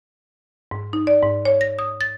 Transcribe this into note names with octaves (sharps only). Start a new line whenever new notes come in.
G#2
D#4
D5
G#2
C#5
A#6
D#6
A6